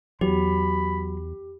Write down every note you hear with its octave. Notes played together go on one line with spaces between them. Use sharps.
E2 F#3 G4 B5